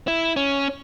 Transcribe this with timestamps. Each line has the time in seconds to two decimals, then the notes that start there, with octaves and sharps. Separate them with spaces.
0.08 E4
0.36 C#4